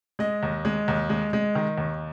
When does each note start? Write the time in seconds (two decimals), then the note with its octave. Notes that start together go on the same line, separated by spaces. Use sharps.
0.19 G#3 D#5
0.43 D#2
0.65 G#3
0.88 D#2
1.10 G#3
1.33 G#3
1.55 D#3
1.78 D#2